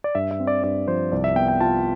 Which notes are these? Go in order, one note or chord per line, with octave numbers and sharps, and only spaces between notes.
D5
G2 E5
E5
C4
D5
G2 D5
F3 C5
C2 D5
E5
B3 G5
G5
F4 A5